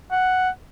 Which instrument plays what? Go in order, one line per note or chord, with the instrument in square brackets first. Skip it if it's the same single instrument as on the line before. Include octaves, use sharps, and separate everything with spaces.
[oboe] F#5